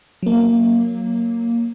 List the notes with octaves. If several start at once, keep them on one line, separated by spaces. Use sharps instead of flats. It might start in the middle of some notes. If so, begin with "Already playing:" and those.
F#3 A#3